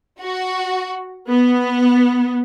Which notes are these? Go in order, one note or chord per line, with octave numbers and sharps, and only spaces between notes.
F#4
B3